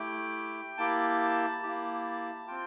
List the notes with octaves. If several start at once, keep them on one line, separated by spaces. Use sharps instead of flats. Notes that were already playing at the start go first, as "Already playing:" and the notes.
Already playing: A3 E4 G4 G5
A#3 E4 G4 A5
A#3 E4 G4
C4 F4 G5